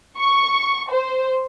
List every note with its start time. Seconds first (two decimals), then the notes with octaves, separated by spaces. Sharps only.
0.18 C#6
0.90 C5